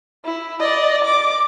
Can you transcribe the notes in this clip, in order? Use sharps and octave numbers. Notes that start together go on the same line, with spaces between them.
E4
D5 D#5
D6